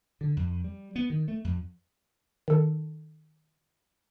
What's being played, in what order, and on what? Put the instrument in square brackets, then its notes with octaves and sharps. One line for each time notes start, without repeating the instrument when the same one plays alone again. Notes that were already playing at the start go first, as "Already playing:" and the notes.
[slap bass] D3
F2
G3
B3
D#3
A3
F2
[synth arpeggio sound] D#3 A4